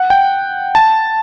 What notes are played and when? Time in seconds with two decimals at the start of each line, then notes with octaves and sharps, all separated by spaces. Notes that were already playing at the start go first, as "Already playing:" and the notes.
Already playing: F#5
0.10 G5
0.75 A5